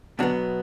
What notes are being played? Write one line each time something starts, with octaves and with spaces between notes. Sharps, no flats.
B2 D3 F#3 B3 D4